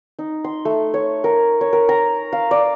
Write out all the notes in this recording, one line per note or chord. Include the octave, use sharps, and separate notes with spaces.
D#4
C6
A3
C#5
A#4
C#5
A#4
A#5
F5
D5